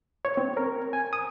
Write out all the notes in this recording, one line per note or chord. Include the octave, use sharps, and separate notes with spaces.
C#5
C4
A#4
G#5
D#6